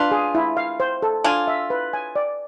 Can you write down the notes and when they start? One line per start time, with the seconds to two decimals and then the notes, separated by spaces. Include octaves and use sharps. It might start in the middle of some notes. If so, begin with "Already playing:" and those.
Already playing: D4 F4 B4
0.11 G#4
0.35 E4
0.57 F5
0.80 C5
1.02 A4
1.24 D4 F4 G#5
1.47 E5
1.70 B4
1.93 G#5
2.16 D5